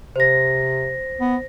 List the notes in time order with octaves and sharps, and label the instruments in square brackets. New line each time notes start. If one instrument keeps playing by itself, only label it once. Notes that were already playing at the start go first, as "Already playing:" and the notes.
[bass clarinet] C3 [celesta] C5 A#6
[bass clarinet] B3